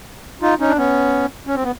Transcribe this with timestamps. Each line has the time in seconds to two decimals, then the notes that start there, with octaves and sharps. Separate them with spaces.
0.42 D#4 F4
0.60 C#4 D#4
0.69 D4
0.77 B3 C#4
1.47 C#4
1.55 C4
1.63 B3